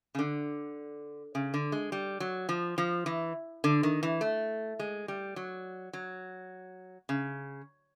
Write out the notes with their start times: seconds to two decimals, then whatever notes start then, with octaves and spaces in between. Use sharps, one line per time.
0.15 C#3
0.19 D3
1.35 C#3
1.54 D3
1.72 G#3
1.92 G3
2.20 F#3
2.49 F3
2.78 F3
3.06 E3
3.64 D3
3.83 D#3
4.03 E3
4.21 A3
4.80 G#3
5.08 G3
5.36 F#3
5.93 F#3
7.09 C#3